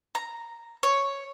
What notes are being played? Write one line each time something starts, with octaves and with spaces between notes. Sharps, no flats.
A#5
C#5